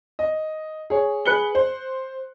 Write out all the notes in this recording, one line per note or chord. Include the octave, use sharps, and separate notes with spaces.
D#5
G#4 C#5
G#4 B4 F#6 C#7 G7
C5